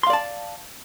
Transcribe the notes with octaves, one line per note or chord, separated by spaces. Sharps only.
D5 F5 A5 C6